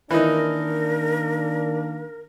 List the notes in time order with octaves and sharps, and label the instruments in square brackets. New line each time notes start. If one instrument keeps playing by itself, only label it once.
[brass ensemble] D#3 A#3 D4 [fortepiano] E3 D#4 [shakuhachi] A#4